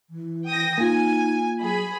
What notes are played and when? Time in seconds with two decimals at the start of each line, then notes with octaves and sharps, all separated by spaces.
0.10 E3
0.46 G5 D#6 A#6
0.78 A#3 D#4 F4 G#5
1.61 F#3 G#4 B5